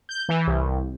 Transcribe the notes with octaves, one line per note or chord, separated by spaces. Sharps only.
G6
E3
C2